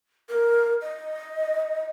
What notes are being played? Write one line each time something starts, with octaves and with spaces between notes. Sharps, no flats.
A#4
D#5